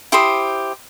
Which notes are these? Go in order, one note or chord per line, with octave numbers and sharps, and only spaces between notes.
E4 G4 C5 D#6